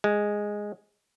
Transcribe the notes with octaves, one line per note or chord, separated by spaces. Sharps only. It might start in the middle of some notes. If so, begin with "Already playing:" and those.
G#3